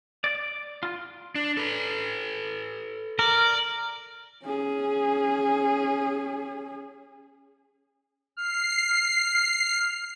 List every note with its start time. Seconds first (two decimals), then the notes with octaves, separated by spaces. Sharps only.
0.24 D5
0.83 F4
1.35 D4
1.57 A4 B4
3.19 A#4 D5
4.45 C#4 G#4
8.37 F6 C7